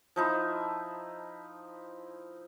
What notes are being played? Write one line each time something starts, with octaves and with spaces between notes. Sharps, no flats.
F3 D#4 E4